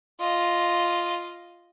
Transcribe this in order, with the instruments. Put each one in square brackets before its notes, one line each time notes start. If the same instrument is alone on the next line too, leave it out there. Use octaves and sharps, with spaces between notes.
[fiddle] F4 D#5